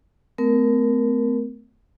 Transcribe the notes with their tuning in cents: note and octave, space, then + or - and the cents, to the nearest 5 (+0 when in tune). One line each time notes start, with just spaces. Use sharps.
A3 +0 C4 -45 A#4 +5